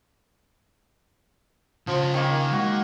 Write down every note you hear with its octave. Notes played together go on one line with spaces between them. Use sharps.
C#3 F3 C6
D#3 A#3
G#3 F#4